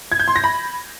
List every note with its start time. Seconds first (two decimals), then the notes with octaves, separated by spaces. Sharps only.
0.12 G#6
0.20 G6
0.28 C6
0.36 A#6
0.44 B5